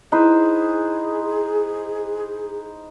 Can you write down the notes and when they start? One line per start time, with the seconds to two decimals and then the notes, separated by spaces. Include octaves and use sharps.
0.12 D#4 E4 G#4 B4 C5